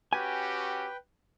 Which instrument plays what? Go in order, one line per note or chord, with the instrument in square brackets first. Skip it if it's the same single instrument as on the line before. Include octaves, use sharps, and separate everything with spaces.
[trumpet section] C#4 F#4 G4 [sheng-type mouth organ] B4 G5 [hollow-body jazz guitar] G#5